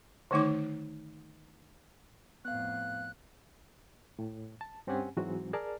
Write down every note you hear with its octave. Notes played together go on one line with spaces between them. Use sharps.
D3 D#3 A3 D#4 D6
F2 A2 B3 F5 F#6
A2
A5
G2 C4 C#4 G4 F#5 G#5
G#2 E3 F#3 G#3 C4 F#4
G#4 A#4 D5 A5 F6